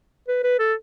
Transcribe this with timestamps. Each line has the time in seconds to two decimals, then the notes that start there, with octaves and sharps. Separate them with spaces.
0.28 B4
0.44 B4
0.59 A4